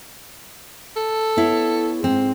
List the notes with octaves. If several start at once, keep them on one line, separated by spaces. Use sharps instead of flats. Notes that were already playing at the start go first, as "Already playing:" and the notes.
A4
B3 E4 C#5
G#2 C4